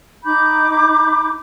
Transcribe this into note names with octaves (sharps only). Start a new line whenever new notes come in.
D#4 B5 D6 G6